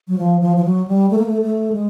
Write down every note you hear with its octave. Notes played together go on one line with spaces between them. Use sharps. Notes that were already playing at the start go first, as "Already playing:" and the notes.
F#3
F3
F3
F3
F#3
G3
A3
A#3
A3
A3
G#3